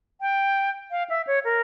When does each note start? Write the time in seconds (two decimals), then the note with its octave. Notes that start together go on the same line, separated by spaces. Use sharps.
0.21 G5
0.91 F5
1.10 E5
1.27 C#5
1.45 A#4